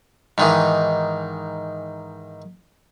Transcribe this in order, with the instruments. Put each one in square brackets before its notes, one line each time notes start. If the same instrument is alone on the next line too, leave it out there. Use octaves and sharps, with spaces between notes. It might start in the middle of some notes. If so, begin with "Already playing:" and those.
[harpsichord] G#2 D#3 E3